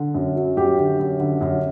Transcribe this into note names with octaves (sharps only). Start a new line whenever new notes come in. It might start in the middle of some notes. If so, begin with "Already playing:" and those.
Already playing: D3
F#2
F#3
F#2 G4
D3
F#2
D3
F#2